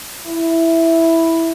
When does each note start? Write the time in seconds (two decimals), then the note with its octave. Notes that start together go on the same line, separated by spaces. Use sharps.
0.26 E4